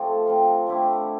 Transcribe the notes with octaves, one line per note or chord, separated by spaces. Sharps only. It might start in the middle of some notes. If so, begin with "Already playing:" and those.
Already playing: C3 F3 A3
F3 C4 F4
D3 A3 E4 G4